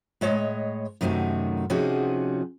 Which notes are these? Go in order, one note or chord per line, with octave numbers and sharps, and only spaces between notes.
A2 G#3 C#5 D#5
F#2 C3 D#3 A3 D#4 F#4
C3 F3 C#4 D#4 F#4 G#4